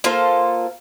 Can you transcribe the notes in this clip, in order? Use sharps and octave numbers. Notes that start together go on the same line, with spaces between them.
A#3 F4 A4 C5